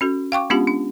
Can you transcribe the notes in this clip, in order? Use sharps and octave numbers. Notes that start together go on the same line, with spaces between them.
C#4 F#4 A4
F5 G5 C#6 D6
G#3 B3 C#4 D4 F4 G4
D4